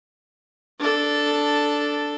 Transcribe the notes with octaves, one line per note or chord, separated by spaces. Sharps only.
D4 A4